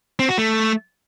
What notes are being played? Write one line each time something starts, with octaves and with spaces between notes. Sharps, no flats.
C4
F#4
A3